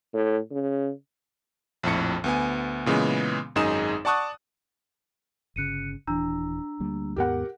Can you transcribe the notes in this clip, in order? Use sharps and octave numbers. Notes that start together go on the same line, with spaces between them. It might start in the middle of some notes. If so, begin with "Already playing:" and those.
A2
C#3
A#1 F2 A2 C#7
D2 B3 G#5
A#2 C#3 E3 G#3 B3
G#1 F#2 G#3 D#4 G#4 E7
D5 F#5 A5 C#6 D#6 F#6
G1 C#3 F#6 C#7 D#7
D#1 E3 D4 A#5 E6
D2 G3 A#3
D#2 G#2 B3 G4 A#4 F#5